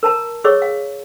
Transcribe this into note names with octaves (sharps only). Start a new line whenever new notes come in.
A#4 A5 A#5
G#4 C#5 D#5 C#6 E6
F5